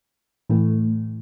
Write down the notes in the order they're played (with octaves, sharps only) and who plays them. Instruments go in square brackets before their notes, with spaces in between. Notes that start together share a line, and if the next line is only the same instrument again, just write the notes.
[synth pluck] A2 E3 A3